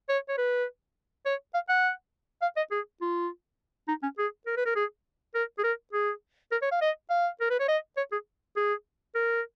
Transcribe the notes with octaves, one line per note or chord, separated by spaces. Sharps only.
C#5
C#5
B4
C#5
F5
F#5
F5
D#5
G#4
F4
D#4
C#4
G#4
A#4
B4
A#4
G#4
A#4
G#4
A#4
G#4
A#4
C#5
F5
D#5
F5
A#4
B4
C#5
D#5
C#5
G#4
G#4
A#4